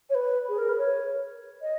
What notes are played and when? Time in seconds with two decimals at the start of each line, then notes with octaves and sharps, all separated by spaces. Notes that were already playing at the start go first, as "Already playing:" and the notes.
0.09 C#5
0.14 B4
0.48 G#4
0.58 A#4
0.68 B4
0.77 C#5
1.61 D#5